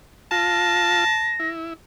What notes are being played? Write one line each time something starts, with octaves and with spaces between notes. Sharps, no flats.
F4 A5 A#6
E4